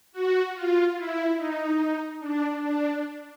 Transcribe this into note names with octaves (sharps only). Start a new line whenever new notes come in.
F#4
F4
E4
D#4
D4
D4